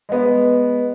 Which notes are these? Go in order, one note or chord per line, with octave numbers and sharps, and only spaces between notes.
G#3 B3